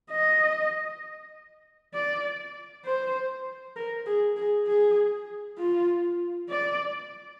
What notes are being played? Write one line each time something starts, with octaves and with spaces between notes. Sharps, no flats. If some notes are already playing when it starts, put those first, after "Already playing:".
D#5
D5
C5
A#4
G#4
G#4
G#4
F4
D5